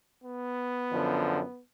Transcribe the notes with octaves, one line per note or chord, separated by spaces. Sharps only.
B3
F#2 D3 F3